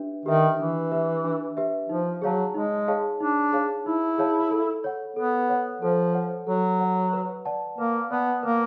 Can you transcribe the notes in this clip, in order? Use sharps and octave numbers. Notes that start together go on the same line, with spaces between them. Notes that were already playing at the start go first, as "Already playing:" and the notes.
Already playing: D4 G4 B4 E5
D#3 G4 B4 E5
E3 D4
G4 B4 E5
D4
G4 B4 E5
F3 D#4
F#3 G#4 C#5 F5 A5
G#3 D#4
G#4 C#5 F5 A5
D4 D#4
G#4 C#5 F5 A5
D#4 E4
G#4 C#5 F5 A5
A4
C#5 F#5
B3 A4
C#5 F#5
F3 A4
C#5 F#5
F#3 A4
C#5 F#5
B4
D5 F#5 A5
A#3 B4
B3 D5 F#5 A5
A#3 B4